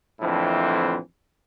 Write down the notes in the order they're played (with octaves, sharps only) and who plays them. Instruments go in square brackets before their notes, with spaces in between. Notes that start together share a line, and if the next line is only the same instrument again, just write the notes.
[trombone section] A#1 F2 A2 D3 E3 C4